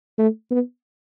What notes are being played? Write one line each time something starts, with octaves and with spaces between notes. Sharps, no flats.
A3
B3